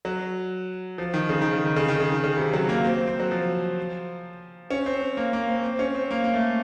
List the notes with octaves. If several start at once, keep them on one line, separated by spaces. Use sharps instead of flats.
F#3
F3
D#3
C#3
D#3
C#3
D#3
C#3
D#3
C#3
D#3
C#3
C3
F#3
A#3
C4
C4
C4
F#3
F3
C#4
C4
C4
A#3
A#3
C4
C4
C#4
C4
A#3
A#3
A3